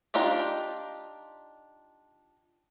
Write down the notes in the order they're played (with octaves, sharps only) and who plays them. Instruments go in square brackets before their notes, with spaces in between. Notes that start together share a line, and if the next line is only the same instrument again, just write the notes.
[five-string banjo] D4 D#4 F4 G4 D5